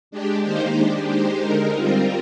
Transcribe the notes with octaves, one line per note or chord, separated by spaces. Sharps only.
G#3 D4 G4
D#3 A#3 D#4 G4 C5
G#3 D4 G4
G#3 D#4 G4 C5
D3 G#3 D#4 A#4
G3 C4 F4 A#4